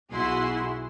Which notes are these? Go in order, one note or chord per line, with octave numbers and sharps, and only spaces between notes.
B1 E4 F#4 G#4 C6